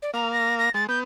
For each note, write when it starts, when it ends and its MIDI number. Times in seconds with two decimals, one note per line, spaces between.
0.02 0.11 74
0.14 0.69 58
0.14 0.69 77
0.14 0.32 82
0.33 0.57 94
0.59 0.73 94
0.74 0.87 56
0.74 0.84 93
0.89 1.04 59
0.89 0.99 91